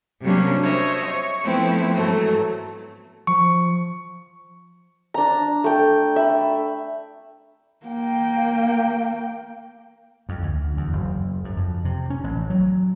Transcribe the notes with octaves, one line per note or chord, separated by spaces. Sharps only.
C3 F#3 G3 A#3 C#4 D4
C5 C#5 D#5 E5
C#6
F3 A3 B3 C4 E4
G#2 E3 F#3 A3
F3 C#6
D4 A#5
A3 G5
E5 B5
A#3 G5
F2
D2
E2
F#1
F#2
F2
C3
C#4
A1
F#3